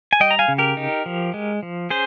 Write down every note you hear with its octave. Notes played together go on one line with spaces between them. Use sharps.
G#5
G3 D#5 G5
A#5
F5 G#5
C#3
G4 A#4
D#4
F3
G#3
F3
C#4 G#4 C5